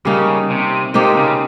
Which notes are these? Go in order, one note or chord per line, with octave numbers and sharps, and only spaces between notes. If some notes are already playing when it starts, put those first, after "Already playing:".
C#3 G3 A#3 D#4
C3
C3 A#3 D#4 G4 C5
C#3